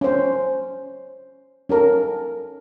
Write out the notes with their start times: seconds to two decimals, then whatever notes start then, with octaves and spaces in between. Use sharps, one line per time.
0.01 C#4 C5
1.69 C#4 A4 A#4